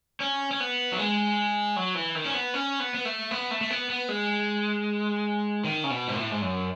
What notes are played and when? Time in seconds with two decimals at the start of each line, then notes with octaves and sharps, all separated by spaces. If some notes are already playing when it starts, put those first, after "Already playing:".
0.20 C#4
0.51 C#4
0.60 B3
0.92 F#3
0.98 G#3
1.76 F#3
1.95 E3
2.15 D#3
2.25 C#4
2.34 B3
2.54 C#4
2.80 B3
2.95 B3
3.05 A3
3.31 B3
3.51 A3
3.61 A3
3.70 B3
3.90 B3
4.09 G#3
5.64 D#3
5.84 C#3
5.90 B2
6.08 G#2
6.16 A2
6.31 G#2
6.42 F#2